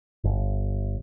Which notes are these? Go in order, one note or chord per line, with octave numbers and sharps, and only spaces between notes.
G1